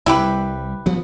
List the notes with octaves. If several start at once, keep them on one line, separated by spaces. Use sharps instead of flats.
C2 G3 E4 G4 B4
D2 F3 B3